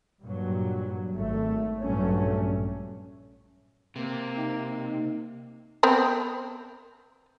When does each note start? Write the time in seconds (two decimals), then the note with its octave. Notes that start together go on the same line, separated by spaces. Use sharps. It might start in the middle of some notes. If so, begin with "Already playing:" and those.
0.22 G2 A#2 F#3
1.13 G#1 A3
1.82 A#1 G2 F#3 A3 C#4
3.96 C3 A#3
4.38 D#4
5.83 B3 C4 A#4